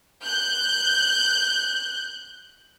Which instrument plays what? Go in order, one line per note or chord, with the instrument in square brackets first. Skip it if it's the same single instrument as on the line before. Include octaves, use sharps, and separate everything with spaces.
[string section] F#6 G6